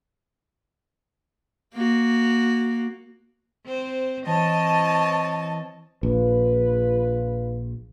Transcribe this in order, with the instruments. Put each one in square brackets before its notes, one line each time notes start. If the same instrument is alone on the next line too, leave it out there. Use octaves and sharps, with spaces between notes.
[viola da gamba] A#3 F#4
C4 C5
[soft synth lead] E3 [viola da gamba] C4 C#5 D#5 [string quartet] A5
[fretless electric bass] A#1 [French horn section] F4 B4